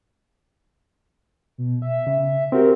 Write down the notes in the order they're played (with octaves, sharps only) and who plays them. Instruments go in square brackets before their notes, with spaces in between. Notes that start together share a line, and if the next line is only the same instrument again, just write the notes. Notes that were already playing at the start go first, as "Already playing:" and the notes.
[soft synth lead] B2
E5
[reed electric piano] C#3
[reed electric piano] C4 F#4 G4 [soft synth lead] A#4